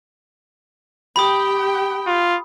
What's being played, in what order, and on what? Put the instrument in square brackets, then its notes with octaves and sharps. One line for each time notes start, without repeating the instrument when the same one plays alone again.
[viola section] G4 G5 [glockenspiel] B5 D#6
[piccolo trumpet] F4